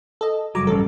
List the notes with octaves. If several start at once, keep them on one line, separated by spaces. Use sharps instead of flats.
A4 D#5
F#1 F#3 G3 A#5 D6
A1 F#2 A4